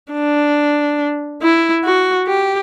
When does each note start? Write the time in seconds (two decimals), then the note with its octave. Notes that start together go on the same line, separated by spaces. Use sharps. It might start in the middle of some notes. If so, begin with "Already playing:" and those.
0.12 D4
1.42 E4
1.84 F#4
2.28 G4